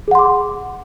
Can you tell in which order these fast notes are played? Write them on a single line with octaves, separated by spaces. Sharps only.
G#4 F#5 C6 D6